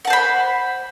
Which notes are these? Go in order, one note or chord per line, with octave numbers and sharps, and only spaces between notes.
C5 F#5 A5 B5